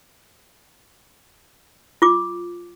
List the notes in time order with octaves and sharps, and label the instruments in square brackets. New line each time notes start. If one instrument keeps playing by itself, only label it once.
[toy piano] F4 D6